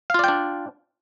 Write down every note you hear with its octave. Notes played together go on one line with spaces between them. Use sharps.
D4 F4 D5 F5 G5